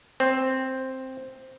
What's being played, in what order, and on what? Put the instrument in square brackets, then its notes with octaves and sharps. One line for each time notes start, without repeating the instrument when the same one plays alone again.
[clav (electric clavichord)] C4